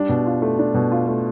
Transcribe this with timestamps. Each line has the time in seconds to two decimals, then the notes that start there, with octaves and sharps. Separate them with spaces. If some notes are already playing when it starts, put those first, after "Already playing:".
Already playing: G3 D4
0.09 B2
0.26 F4
0.42 A3
0.59 D4
0.74 B2
0.92 F4
1.08 A3